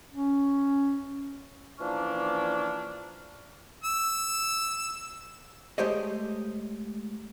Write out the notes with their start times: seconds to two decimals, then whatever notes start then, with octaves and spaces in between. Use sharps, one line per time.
0.14 C#4
1.79 E3 F3 A#3 C#4 D4
3.84 E6
5.78 G#3 A3 G4 C5 C#5 D#5